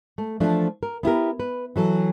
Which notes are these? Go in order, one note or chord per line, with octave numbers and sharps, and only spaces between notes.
A3
E3 F3 A3 D4
A#4
B3 E4 G4 A#4
B4
E3 F#3 A4